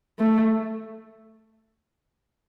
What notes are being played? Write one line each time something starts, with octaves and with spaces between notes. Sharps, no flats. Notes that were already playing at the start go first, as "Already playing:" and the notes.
A3